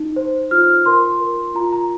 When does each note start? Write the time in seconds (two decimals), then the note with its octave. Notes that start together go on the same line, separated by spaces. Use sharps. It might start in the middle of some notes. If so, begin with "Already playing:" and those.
Already playing: D#4
0.16 C5
0.51 F4 F6
0.86 A#4 C6
1.20 A#4
1.55 F4 A#5
1.73 A#5